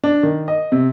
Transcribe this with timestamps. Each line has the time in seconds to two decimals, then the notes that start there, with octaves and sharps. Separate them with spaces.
0.04 D4
0.23 D#3
0.48 D#5
0.72 C3